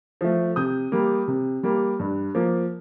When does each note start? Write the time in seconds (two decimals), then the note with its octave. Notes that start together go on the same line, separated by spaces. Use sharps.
0.21 F3 A3
0.56 C3 D#6 G6
0.92 G3 A#3
1.28 C3
1.63 G3 A#3
1.99 G2
2.35 F3 A#3